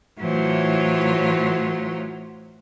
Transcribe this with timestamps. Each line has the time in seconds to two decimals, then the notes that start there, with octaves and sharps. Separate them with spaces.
0.18 A2 E3 F#3 F4 C5